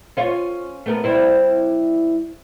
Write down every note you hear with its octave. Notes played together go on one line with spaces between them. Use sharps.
C#4 F4 C#5
A3 B3 A#4
G3 C4 E4